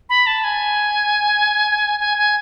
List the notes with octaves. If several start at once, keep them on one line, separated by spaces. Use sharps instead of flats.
B5
A5
G#5
G#5
G#5